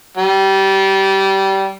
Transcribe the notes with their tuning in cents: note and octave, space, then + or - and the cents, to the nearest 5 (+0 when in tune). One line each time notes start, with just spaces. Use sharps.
G3 -20